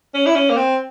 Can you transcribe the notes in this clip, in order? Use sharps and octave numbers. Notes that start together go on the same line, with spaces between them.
C#4
E4
C#4
A#3
C4